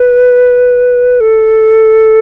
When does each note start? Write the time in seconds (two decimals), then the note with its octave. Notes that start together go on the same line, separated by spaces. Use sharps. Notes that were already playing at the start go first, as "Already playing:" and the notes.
Already playing: B4
1.20 A4